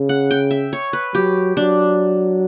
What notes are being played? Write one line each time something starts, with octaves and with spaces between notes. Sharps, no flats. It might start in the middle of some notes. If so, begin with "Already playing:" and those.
Already playing: C#3
F#5
G5
E5
C#5
B4
F#3 G4
F#3 D4